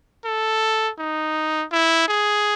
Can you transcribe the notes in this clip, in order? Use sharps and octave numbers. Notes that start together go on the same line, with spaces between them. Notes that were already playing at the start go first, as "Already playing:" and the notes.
A4
D#4
E4
G#4